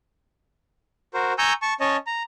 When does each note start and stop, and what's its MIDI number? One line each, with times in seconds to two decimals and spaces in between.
1.14 1.33 66
1.14 1.33 70
1.14 1.33 72
1.38 1.53 80
1.38 1.53 82
1.38 1.53 85
1.38 1.53 88
1.38 1.53 91
1.62 1.74 81
1.62 1.74 85
1.81 1.97 61
1.81 1.97 73
1.81 1.97 75
1.81 1.97 81
2.07 2.23 82